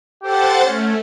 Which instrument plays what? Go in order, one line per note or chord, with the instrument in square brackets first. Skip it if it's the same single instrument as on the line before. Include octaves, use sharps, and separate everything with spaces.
[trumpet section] G4 A4 [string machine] C5 F#5 A6
[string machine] A3 [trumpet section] C#4